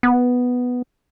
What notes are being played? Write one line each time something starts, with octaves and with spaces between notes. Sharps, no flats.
B3